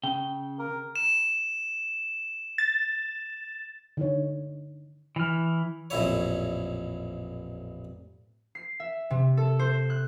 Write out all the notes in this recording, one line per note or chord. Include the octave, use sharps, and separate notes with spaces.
C#3 G5
A#4
E7
A6
D3 D#4 C#5
E3 F6
A1 F2 A#2 E4 C#5
C7
E5
C3
A4
C5
F#6